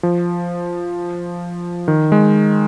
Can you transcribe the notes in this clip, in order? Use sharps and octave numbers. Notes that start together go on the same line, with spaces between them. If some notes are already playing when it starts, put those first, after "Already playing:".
F3
D#3
G#3